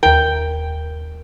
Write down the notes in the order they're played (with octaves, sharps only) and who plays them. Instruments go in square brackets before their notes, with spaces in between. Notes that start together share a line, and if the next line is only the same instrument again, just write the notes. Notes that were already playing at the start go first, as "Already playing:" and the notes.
[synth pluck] D#2 A#4 [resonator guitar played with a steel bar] G5